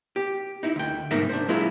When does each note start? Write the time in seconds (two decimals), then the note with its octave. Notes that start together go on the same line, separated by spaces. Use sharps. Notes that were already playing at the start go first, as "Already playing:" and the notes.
0.16 G4
0.63 D#4 E4
0.76 D2 G5
1.11 C2 G#2 A#3 D#4 A#4 E5
1.30 D4 C5
1.48 F#3 G#3 E4 F4 G#4